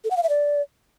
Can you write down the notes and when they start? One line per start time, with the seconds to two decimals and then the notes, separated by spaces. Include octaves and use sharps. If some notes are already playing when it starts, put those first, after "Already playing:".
0.04 A4
0.11 F#5
0.17 F5
0.23 E5
0.29 D5